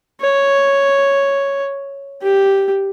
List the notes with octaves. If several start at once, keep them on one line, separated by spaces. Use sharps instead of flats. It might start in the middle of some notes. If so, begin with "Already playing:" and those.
C#5
G4